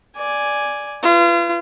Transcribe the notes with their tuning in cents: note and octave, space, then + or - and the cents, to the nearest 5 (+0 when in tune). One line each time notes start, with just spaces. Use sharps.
D5 +0 G#5 +0
F4 -35 B4 +5